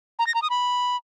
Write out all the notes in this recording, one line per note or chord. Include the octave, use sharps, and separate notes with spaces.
A#5
A#6
A#5
D#6
B5